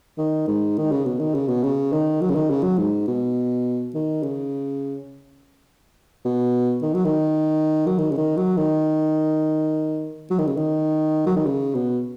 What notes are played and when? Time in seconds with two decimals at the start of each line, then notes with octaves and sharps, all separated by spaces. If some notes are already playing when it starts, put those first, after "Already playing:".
0.18 D#3
0.48 G#2
0.78 D#3
0.92 C#3
1.06 B2
1.19 D#3
1.35 C#3
1.48 B2
1.63 C#3
1.92 D#3
2.21 F#3
2.30 C#3
2.35 D#3
2.50 C#3
2.64 F#3
2.78 G#2
3.08 B2
3.95 D#3
4.23 C#3
6.25 B2
6.82 D#3
6.94 F#3
7.05 D#3
7.87 F#3
7.98 D#3
8.11 C#3
8.18 D#3
8.37 F#3
8.57 D#3
10.30 F#3
10.39 D#3
10.47 C#3
10.57 D#3
11.26 F#3
11.36 D#3
11.46 C#3
11.75 B2